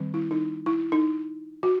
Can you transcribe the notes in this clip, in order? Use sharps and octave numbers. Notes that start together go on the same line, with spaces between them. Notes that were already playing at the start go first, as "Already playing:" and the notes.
Already playing: D#3 G3 C4
E4
D#4
E4
D#4
F#4